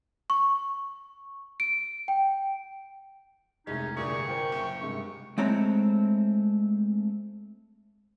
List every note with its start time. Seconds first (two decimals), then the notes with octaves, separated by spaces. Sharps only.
0.30 C#6
1.60 D7
2.08 G5
3.67 F1 C2 G#3 C#4 D#4
3.97 G2 A#2 D3 G#4 C#6
4.28 F4 A#4 C5 G5
4.52 F#1
4.81 G2 C3 G#3 C#6
5.38 G#3 A3 C4 E4 C#5 A#5